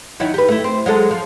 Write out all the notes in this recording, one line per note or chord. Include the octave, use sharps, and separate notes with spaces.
D#3 F#3 E4
G4 B4
A3 E4
C4
F#3 G#3 A4
F3